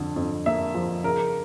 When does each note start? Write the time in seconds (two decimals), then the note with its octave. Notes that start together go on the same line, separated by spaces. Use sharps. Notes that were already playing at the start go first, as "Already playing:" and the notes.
Already playing: F2 D3
0.16 F2
0.46 A#3 E5
0.74 F3
1.04 C#3 A#4